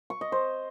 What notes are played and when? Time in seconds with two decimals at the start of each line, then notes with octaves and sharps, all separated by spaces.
0.10 C#6
0.21 D#5
0.32 C5